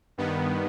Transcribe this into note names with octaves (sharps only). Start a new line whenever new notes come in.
G2 D#3 B3